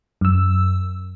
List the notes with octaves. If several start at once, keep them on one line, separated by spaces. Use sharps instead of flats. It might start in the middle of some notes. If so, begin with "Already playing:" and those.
F#2 E6